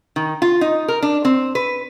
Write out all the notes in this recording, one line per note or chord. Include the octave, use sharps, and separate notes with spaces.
D#3
F4
D#4
A#4
D4
C4
B4